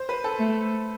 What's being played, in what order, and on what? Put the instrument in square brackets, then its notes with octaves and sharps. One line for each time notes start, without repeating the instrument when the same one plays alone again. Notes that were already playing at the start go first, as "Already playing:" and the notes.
Already playing: [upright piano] C5
B4
A4
[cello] A3